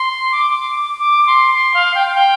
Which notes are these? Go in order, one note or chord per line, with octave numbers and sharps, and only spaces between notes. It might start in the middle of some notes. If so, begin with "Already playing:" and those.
Already playing: C6
D6
D6
C6
C6
F5
G5
F5
G5